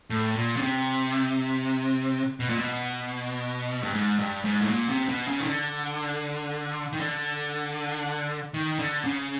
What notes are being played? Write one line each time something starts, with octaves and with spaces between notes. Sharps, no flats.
A2
A#2
C#3
C3
B2
A#2
B2
G2
G#2
G2
G#2
A2
A#2
C3
B2
C#3
D#3
D3
D#3
D3
D#3
D3
C#3